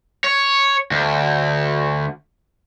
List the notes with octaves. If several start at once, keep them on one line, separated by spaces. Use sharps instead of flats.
C#5
D2